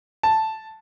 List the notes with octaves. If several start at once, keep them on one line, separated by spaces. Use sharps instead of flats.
A5